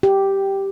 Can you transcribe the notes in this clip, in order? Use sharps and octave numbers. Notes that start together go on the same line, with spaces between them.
G4